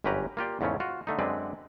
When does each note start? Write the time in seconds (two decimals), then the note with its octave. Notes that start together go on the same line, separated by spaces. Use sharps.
0.04 G1 F#2 C#4 G4 B4 A#5
0.37 A#3 F4 G4 D5
0.61 E2 G#2 C#3 A3 C#4
0.80 F4 F#4
1.07 D3 A3 D#4
1.19 F#2 D3 G#3 C4 B4 D5